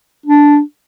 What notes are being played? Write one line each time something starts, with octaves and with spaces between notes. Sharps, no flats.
D4